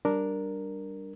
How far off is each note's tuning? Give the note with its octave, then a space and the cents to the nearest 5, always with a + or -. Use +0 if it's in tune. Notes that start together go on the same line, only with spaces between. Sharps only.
G3 -15 D4 +0 A#4 +0